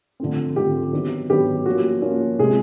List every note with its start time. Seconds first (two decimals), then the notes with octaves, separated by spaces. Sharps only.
0.20 D3 F3 A3 C4
0.56 D3 F3 A3 C4 G4
0.93 D#3 F#3 B3 D4
1.30 D#3 F#3 B3 D4 G4
1.66 F3 A#3 C#4 F#4
2.02 F3 A#3 C#4
2.39 C3 F3 G#3 G#4